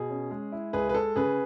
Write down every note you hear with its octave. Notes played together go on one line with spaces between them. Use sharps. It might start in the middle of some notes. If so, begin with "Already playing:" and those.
Already playing: B2 G#4
C#4
G#3
E4
C#2 G#4 B4
B4
G#3 A4
C#3 G#4 B4